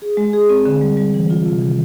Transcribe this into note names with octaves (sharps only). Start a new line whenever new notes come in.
G#4
G#3
G#4
C4
D3
G3
G3
E3
F4
C3
D#3